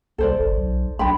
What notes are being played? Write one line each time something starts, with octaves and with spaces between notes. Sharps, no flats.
C2 A4 C5 D5
G1
B1
B1 D4 G5 B5